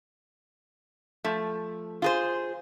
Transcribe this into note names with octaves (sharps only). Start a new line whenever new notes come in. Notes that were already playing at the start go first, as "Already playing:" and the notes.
F3 A3
F4 G#4 C5